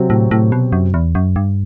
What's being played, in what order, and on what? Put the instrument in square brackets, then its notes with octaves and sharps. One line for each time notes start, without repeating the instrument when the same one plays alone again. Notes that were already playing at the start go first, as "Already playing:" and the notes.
Already playing: [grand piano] C3 F#3 C4 F#4
[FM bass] A2
A2
B2
F#2
E2
F#2
G2